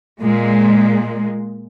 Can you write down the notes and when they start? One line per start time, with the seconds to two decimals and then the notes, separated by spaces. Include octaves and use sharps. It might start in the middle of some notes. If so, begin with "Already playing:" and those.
0.20 A#2 G#3